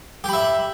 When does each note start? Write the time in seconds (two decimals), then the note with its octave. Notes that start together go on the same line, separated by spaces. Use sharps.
0.24 G4
0.29 B5
0.33 E5